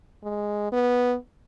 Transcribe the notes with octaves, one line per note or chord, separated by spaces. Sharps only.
G#3
B3